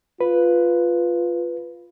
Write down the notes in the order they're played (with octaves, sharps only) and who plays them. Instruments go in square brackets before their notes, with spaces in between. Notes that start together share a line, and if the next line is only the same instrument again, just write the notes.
[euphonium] F4 [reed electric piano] B4